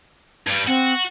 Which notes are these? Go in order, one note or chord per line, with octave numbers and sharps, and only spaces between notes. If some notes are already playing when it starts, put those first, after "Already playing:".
G2 G3
C4 F#4